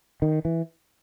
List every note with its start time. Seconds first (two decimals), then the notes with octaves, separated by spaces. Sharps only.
0.22 D#3
0.45 E3